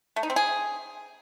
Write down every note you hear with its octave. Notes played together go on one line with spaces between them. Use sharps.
A3
D#4
C4
G#4